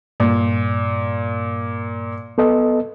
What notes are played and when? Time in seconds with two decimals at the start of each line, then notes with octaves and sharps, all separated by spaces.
0.20 G2 A#2
2.38 B3 A4 D#5